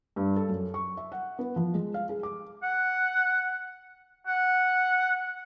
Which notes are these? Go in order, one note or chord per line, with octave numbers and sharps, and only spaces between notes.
G2
A4
F#2
C#6
E5
F#5
B3
F3
G#3
F5
G#4
D6
F#5
F#5